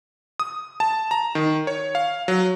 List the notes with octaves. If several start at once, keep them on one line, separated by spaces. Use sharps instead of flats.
D#6
A5
A#5
D#3
C#5
F5
F#3